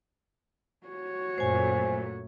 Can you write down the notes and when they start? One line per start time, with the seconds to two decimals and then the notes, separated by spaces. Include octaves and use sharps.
0.87 F#4 C#5
1.38 F#2 A#2 A3 C5 G#5